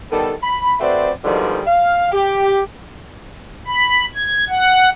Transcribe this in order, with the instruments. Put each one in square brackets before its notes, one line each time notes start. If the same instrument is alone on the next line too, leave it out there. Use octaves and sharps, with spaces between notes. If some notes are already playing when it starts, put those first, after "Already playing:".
[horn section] D#3 G3 B3 A4
B5
A3 C4 F#4 B4 C5 D5
B2 D3 D#3 F3 G3 G#3
F5
G4
[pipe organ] B5
G#6
F#5